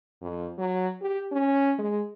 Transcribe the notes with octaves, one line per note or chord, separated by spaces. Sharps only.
F2
F#3
G4
C#4
G#3